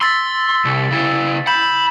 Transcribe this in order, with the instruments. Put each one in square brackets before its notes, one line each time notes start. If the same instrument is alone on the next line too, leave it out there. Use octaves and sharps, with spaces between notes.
[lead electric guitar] C6 [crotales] E6 A6 B6
[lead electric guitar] C2
C#3 E4
[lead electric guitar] B5 [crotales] G6 B6 E7